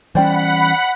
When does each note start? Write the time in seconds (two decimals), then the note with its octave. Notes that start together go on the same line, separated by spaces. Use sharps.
0.15 E3 G3 C#4 C5 D5 F#5 G5 B5